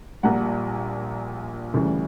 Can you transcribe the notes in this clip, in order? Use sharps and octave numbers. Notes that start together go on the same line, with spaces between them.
A#1 A#2 G3 F#5 A#5
D2 C#3 E3 G3